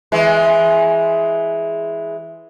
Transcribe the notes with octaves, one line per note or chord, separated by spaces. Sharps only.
E3 G#3